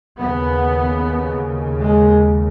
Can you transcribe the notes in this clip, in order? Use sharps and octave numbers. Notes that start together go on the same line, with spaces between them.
D#2 C#3 B3
G#3